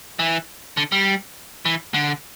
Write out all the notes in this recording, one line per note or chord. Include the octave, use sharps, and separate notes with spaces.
E3
D3
G3
E3
D3